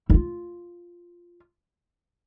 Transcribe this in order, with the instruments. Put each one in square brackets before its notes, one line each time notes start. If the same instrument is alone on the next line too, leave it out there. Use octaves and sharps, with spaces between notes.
[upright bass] E4 F4